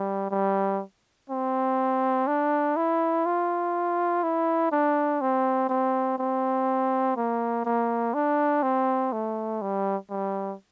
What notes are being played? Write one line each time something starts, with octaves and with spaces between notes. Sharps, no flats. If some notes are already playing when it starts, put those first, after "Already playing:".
Already playing: G3
G3
C4
D4
E4
F4
E4
D4
C4
C4
C4
A#3
A#3
D4
C4
A3
G3
G3